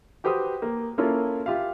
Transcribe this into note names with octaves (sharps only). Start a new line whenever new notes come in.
F#4 G4 B4 C5 D#6
A#3
A#3 C#4 E4 F4 A4 A#4
F4 G4 E5 F5